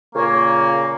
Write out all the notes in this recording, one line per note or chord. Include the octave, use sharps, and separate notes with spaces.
A#2 C#3 A#3 C#5